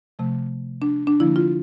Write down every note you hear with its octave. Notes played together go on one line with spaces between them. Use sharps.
C3 F3 A3
D4
D4
D3 F3 A#3 E4
F4